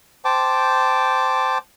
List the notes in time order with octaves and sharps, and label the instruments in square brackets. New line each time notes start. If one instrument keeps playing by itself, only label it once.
[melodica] C5 G5 A5 D6